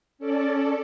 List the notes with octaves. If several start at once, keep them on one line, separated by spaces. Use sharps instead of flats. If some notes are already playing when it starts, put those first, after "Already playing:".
C#4 A4 D5